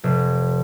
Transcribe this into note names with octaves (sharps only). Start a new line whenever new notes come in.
F1